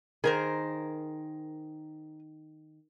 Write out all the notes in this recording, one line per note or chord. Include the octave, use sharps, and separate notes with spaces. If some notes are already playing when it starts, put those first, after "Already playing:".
D#3 G#4 A#4 C5